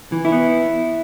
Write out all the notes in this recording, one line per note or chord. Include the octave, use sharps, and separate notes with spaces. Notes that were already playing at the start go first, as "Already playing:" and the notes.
E3
E4
B3